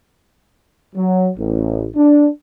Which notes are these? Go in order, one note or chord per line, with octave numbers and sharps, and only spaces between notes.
F#3
A1
D4